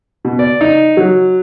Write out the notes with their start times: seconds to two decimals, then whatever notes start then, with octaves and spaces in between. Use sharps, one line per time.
0.25 B2
0.39 D5
0.61 D#4
0.97 F#3